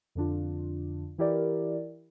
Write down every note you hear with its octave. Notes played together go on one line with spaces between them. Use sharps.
F2 D3 D4 F4
E3 E4 G4 A#4 D5